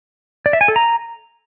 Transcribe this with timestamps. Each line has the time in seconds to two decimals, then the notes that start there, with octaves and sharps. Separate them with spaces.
0.46 D5
0.53 E5
0.61 G#5
0.68 A4
0.76 A#5